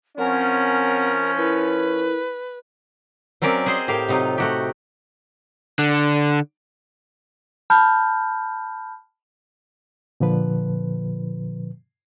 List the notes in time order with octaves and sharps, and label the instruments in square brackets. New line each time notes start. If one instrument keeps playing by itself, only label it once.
[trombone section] F3 C#4 [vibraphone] C4 F#5 G#5 [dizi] A#4
[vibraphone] E4 A#4 [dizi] B4
[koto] F#3 C4 C#4 A#4 D5 E5
G#4 C5 D#5
A2 G4 A#4 F5
C3 F#3 D#4 F4
A3 F#4 G4
[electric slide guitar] D3
[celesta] A5 B5 F6 G6
[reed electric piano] A#2 D3 F3 B4